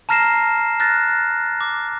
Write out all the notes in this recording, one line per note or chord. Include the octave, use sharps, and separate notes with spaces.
A5 A#5 F6 A#6 C7 E7
F6 F#6 A6 A#6
D6